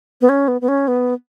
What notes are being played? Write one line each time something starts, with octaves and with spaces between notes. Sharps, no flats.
B3
C#4
B3
B3
C#4
B3